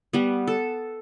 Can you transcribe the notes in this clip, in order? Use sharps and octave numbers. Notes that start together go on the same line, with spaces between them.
G3 B3
A4